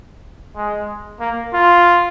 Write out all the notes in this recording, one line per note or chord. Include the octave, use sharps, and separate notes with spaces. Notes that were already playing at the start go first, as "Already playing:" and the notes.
G#3
A#3
F4